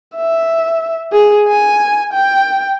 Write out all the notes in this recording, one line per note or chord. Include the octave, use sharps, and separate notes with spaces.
E5
G#4
G#5
G5